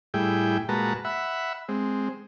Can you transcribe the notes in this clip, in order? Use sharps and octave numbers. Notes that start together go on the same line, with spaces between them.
A2 G3 E4 G#4 G5
A#2 G#3 F#4 B4 A5 A#5
E5 F#5 B5
G#3 C4